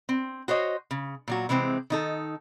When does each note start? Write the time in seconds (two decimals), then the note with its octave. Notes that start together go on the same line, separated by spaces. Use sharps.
0.09 C4
0.48 F#4 C5 C#5 D#5
0.91 C#3
1.28 A#2 F#3 F#4
1.49 C3 E3 G#3 C4
1.90 D#3 D#4 A4